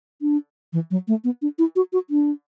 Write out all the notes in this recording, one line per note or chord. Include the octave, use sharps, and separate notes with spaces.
D4
E3
F#3
A3
B3
D4
E4
F#4
F#4
D4